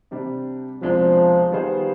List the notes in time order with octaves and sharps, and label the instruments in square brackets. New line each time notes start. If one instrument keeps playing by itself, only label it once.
[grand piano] C3 G3 D4
[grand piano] C2 B2 G#3 D4 G#4 [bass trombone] F3
[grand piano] D#3 B3 F4 G#4 C5 [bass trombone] G3